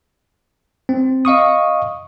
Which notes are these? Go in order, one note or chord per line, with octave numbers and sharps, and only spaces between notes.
C4
D#5 F5 C#6 D#6